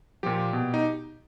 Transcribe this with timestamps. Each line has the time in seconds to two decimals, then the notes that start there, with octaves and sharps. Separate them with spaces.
0.23 A#2 F3 G4
0.53 B2
0.74 D#4